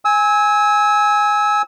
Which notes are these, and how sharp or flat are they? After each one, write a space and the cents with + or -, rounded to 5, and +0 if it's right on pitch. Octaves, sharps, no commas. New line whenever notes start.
G#5 +0 E6 -30